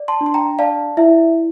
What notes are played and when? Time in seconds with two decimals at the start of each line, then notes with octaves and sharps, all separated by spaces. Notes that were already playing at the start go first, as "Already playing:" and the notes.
Already playing: D5
0.08 A5 C6
0.21 D4
0.26 C6
0.34 G5 A#5
0.59 D5 F5 A5
0.97 E4 E5